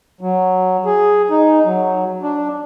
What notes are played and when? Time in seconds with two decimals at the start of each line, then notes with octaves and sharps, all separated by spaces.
0.21 F#3
0.85 G#4
1.30 D#4
1.65 F#3
2.23 D4